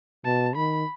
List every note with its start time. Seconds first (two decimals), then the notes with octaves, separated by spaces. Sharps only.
0.25 B2 A5
0.56 D#3 B5